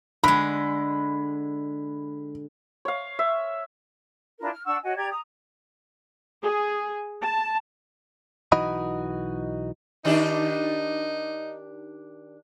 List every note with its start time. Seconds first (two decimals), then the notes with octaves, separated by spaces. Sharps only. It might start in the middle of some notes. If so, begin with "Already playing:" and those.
0.24 D3 G#3 B5
2.85 C#5 F5
3.19 E5
4.39 D4 E4 F4 A#4
4.51 F6
4.65 D4 F#5 C#6 E6
4.83 F#4 C#5 D#5 G#5
4.96 G4 D5 A#5 G#6
5.10 A#5 D#6
6.42 G#4
7.21 A5
8.52 B1 E3 D#4 F#4 D#5 B5
10.05 D#3 D4 D#4 G4